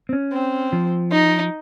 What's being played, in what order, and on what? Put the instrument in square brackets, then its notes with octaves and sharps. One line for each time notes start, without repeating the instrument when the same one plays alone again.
[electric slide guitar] C4
C#4
[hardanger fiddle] C4
[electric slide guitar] F3
[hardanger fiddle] D#4